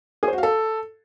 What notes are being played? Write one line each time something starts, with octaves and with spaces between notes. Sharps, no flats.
G#4
C5
F#4
F5
A4